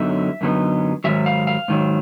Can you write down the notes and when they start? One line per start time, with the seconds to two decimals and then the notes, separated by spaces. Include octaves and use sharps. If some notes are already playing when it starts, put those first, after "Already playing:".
Already playing: F#2 D3 F#3 B3 D#4 E5
0.41 F#2 D3 F#3 B3 D#4
1.04 G#2 D#3 F#3 E5
1.26 F5
1.47 F5
1.68 G#2 D#3 F#3